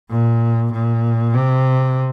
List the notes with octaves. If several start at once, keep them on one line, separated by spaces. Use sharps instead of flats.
A#2
A#2
C3